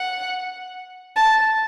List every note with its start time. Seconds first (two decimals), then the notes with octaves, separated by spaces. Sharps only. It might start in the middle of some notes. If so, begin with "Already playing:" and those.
Already playing: F#5
1.16 A5